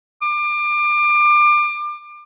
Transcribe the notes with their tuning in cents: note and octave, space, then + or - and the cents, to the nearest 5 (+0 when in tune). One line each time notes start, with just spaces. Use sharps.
D6 +30